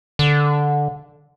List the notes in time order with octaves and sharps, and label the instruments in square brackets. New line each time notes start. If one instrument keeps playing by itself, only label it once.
[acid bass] D3